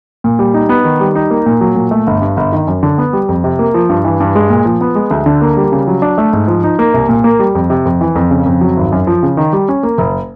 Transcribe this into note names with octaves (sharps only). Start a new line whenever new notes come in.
A#2
G3
D#4
B3
D#3
G3
D#4
A#3
A#2
F#3
A#2
A3
G1
G2
G1
D#3
F#2
D3
B3
G3
F2
C3
A#3
F3
G2
E3
G2
G#3
A#2
F3
B3
G#3
D2
D3
A#3
G3
C#3
F#3
D4
A3
G#2
F3
D#4
A#3
C2
A#2
A#3
G3
F2
C3
F2
E3
F2
C#3
F2
F#3
G#1
F#2
F3
C#3
D#3
G3
C#4
A#3
F#1